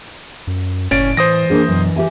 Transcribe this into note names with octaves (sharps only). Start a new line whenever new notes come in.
F#2
F#1 A2 C#4 D5 A6 D7
E3 C5 D#6 A#6
A#3 D4 G#4
F#2 B2
G4 E5 G#5